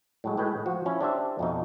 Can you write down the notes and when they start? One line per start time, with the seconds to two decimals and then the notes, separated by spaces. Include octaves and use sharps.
0.24 A2 F#3 G#3
0.37 A2 G#3 B4 G5
0.66 F3 F#4
0.86 C#4 E4
1.01 D4 G4 C5 E5
1.39 F2 B2 D#4